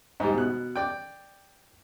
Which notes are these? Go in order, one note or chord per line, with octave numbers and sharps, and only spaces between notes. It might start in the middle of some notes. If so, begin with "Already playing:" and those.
G#2 G3
B2 F#6
D5 G5